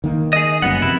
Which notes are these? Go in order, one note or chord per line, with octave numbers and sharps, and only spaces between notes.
D#3 A#3
G#4 D#5
G1 F#2 A#3 B3 F#5
F2 C3 E4